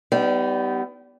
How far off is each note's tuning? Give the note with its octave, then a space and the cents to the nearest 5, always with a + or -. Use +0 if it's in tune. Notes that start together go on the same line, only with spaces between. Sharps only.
G3 -20 B3 +20 D#4 +0